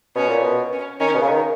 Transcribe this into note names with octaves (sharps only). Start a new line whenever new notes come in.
B2 C#4
A#2
B2
C#4
D#3 C#4
B2
C#3
D#3